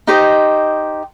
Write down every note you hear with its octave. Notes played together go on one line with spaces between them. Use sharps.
D#4 G4 C5 D#5